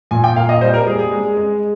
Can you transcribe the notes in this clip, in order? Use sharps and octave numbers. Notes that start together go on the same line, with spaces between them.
A#2 G#5
G5
A#3 F5
D#5
G3 C5
A#4
G3 G#4
G#4
G#3
G#3